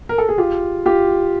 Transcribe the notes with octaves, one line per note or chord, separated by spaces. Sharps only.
A#4
A4
G#4
F4 G4
F4 G4